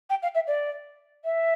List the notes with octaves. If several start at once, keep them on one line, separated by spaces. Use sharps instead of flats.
G5
F5
E5
D5
E5